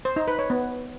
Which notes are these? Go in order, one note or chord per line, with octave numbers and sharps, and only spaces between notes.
C5
D#4
B4
C#5
B3